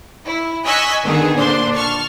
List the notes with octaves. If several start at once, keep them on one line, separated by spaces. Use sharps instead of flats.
E4
D#5 G#5 C#6 E6 F#6 B6
D3 D#3 B3 G#4
A#2 D3 D4 C5 C6
A5 C#6 F6